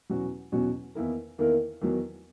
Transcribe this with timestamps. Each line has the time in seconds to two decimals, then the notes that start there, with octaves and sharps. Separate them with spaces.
0.10 E2 B2 F#3 C#4 F#4
0.52 E2 B2 F#3 C#4 F#4
0.95 E2 D#3 A#3 E4 A#4
1.38 E2 D#3 A#3 E4 A#4
1.81 E2 D#3 F#3